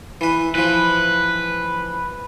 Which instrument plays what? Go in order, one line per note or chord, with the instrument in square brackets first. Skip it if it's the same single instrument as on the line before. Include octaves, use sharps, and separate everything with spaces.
[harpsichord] E3 B4
[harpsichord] E3 F3 [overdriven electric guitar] B4